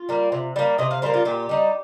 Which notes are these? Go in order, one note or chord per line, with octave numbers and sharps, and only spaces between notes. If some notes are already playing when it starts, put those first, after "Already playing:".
Already playing: F4
G3 A#3
C3
G3 A#3
C3 D#5
F5
G3 A#3 C5
F4
A#2 G4
G3 D#4